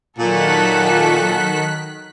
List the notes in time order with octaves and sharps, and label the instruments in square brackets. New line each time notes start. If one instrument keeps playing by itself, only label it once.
[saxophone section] A#2 [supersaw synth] D#3 F#6 B6 [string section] F#3 F#4 A4